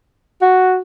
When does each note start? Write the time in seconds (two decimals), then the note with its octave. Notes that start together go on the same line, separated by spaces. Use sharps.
0.42 F#4